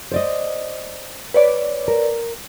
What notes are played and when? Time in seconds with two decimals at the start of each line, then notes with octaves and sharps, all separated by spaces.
0.12 C5 D5 D#5
1.34 B4 C#5 D5
1.88 A#4